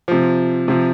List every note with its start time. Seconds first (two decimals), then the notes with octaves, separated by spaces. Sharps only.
0.08 C3 F3
0.68 C3 F3